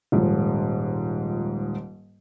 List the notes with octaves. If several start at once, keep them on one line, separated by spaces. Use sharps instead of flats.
D#1 G#2 F3